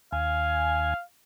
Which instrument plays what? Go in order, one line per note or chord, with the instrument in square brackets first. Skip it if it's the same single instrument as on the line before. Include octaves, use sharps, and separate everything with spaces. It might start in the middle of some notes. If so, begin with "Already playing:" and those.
[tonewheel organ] D#2 G#5 [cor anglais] F5